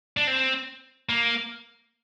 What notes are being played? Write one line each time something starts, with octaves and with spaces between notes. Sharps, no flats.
D4
C4
A#3